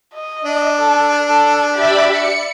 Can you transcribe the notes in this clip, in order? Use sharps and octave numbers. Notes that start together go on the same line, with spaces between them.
D#5
D4
A4
A4
G4 D5 E5 B5
C#7